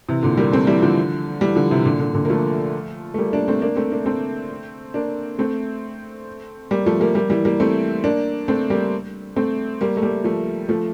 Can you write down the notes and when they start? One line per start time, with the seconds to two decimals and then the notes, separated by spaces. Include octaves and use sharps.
0.09 C3 E3
0.23 A#2 D3
0.37 G3 A#3
0.52 A3 C4
0.67 E3 G3
0.82 D3 F3
1.41 E3 G3
1.56 D3 F3
1.71 C3 E3
1.85 A#2 D3
2.00 A#2 D3
2.14 A#2 D3
2.25 A#3
2.30 F3 A3
3.14 A3
3.18 G3 A#3
3.33 A#3 D4
3.48 A3 C4
3.62 A#3 D4
3.76 A3 C4
3.92 A#3 D4
4.06 A3 C4
4.94 A#3 D4
5.39 A3 C4
6.71 G3 A#3
6.86 F3 A3
7.00 G3 A#3
7.15 G3 A#3
7.30 E3 G3
7.45 G3 A#3
7.60 A3 C4
8.04 A#3 D4
8.48 A3 C4
8.70 G3 A#3
9.36 A3 C4
9.81 G3 A#3
9.97 A3
10.03 G3 A#3
10.24 F3 A3
10.69 F3 A3